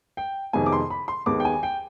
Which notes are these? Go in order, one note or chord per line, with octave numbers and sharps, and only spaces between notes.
G5
F2 C3 D#3 G#3 B3 G#5
D6
C6
B5
C6
D#2 D#3 G#3 B3 D6
G5
G#5
G5